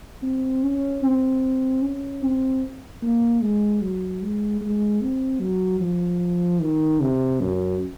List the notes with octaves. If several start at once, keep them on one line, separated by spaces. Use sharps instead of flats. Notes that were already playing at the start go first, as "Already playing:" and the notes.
C4
C#4
C4
C#4
C4
A#3
G#3
F#3
G#3
G#3
C4
F#3
F3
D#3
C3
F#2